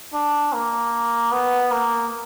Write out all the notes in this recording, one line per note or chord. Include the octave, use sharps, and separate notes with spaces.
D4
A#3
B3
A#3